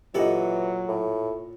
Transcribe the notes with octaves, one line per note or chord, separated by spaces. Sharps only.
A#2 E3 F#3 G4 A4 D#5 F#5
A2